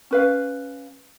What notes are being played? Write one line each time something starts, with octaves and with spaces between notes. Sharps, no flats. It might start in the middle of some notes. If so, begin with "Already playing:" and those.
C#4 B4 F5